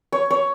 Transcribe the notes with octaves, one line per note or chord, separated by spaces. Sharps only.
C#5
C#5